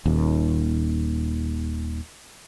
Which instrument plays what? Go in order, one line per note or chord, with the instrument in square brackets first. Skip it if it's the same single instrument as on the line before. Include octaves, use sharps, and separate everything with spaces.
[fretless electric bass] D#1 D#2